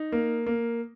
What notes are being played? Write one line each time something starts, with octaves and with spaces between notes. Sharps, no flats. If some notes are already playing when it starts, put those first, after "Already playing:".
Already playing: D#4
A#3
A#3